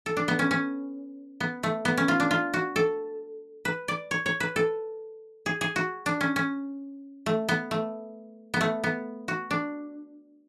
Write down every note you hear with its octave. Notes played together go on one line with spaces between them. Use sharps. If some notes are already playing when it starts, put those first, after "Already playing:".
A4
D4
B3
C#4
C#4
B3
A3
B3
C#4
F4
D4
F4
F#4
A4
B4
D5
C#5
C#5
B4
A4
G#4
G#4
F#4
D4
C#4
C#4
A3
B3
A3
B3
A3
B3
F#4
D4